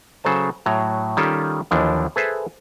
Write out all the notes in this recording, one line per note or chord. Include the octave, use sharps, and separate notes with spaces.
C#3 F#3 A4 C5 A5
A2 F#3 A#5
D#3 G3 C#4 F4 G4 A4
D#2 E3 F3 D4
G#4 A4 B4 C5 E5